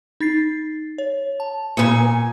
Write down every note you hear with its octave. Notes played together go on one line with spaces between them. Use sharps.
D#4 A6 C7
C#5
A5
A#2 B4 G#5 D#6 C#7